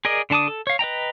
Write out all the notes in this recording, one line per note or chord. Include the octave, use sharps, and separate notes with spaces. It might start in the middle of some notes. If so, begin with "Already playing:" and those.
G#4 A#4 D5 D#5
D3 D4 A5 D6 D#6
A4
C#5 F5
B4 D#5 G5 A#5